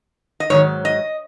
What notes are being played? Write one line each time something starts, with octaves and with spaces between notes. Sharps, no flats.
D#5
G#2 D#3 F#3 C#5
D#5